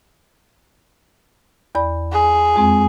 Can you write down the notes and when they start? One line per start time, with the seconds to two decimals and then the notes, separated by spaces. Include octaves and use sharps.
1.75 E2 D5 B5
2.12 G#4
2.56 F2 G#3 C4